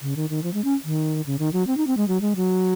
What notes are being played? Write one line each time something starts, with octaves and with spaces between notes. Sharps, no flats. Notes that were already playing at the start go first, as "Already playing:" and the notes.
C#3
D#3
D#3
F3
G#3
C#4
D#3
C#3
D#3
F#3
C4
D#4
C4
G#3
F#3
G#3
F#3